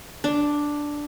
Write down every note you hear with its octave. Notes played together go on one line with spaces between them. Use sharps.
D4